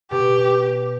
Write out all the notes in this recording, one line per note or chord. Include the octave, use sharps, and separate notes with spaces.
B2 G4